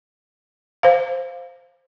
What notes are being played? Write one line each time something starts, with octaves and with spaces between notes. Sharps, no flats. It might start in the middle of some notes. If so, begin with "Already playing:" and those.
C5 F5